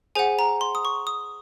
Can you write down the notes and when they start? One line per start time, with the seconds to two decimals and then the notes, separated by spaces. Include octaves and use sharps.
0.15 G#4 C5 F#5 G#5
0.39 A#5
0.61 C6
0.75 D#6
0.85 C#6
1.07 D#6